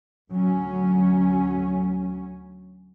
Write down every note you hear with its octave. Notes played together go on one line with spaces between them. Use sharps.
D2 F#3 C#4